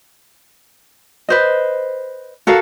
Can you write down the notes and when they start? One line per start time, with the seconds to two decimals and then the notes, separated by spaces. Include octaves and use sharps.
1.29 B4 C5 D#5
2.47 F#4 A4 A#4 F5